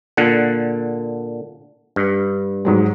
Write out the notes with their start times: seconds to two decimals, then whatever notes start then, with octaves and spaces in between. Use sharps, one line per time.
0.17 A#2 D3 F#5
1.96 G2
2.65 G#2 F#3 G#3